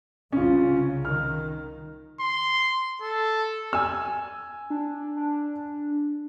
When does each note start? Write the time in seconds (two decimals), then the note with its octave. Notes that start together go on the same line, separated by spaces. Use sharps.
0.32 C2 C#3 C#4 F4
1.05 D#3 F6
2.20 C6
3.02 A4
3.73 G#5 E6
4.70 D4
5.17 D4